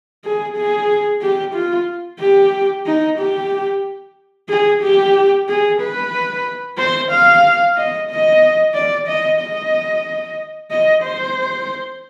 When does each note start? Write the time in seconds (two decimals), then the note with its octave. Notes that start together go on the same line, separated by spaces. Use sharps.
0.24 G#4
0.56 G#4
1.22 G4
1.54 F4
2.20 G4
2.86 D#4
3.18 G4
4.49 G#4
4.82 G4
5.48 G#4
5.81 B4
6.78 C5
7.11 F5
7.78 D#5
8.10 D#5
8.75 D5
9.08 D#5
9.40 D#5
10.71 D#5
11.04 C5